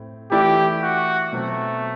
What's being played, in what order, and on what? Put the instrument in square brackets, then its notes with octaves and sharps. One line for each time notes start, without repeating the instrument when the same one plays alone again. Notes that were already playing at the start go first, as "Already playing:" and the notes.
Already playing: [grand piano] A2 C4
[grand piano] E3 A3 E4 B4 D5 [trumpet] G4
[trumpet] F#4
[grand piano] B2 F#3 C4 [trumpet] A3